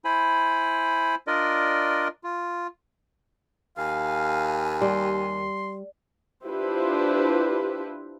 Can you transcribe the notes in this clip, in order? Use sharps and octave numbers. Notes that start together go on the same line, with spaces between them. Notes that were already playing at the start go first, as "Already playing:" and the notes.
E4 C5 G#5 B5
D4 F4 A#4 D5 D#5
F4
D#2 F5 G#5
G3 C6
D4 E4 F4 G4 B4 C5